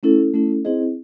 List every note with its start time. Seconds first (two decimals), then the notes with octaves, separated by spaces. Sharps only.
0.03 A3 C#4 E4 A4
0.34 A3 C#4 E4 A4
0.65 C4 E4 G#4 C5 D#5